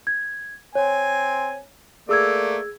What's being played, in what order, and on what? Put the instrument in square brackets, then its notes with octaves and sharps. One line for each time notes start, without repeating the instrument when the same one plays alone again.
[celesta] G#6
[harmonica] C4 G#5 [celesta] C#5
[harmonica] A3 A#3 D5 [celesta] G#4 E6 G#6